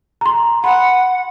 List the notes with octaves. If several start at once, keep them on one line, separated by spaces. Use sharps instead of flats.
A#5 C6
F#5 B5